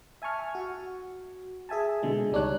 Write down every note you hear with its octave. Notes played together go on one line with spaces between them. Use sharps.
E5 G#5 A5 C#6 F6
F#4
G#4 E5 G#5 A5
B2 D3 G#3
C#2 G3 D4 D#4 C#5 F#6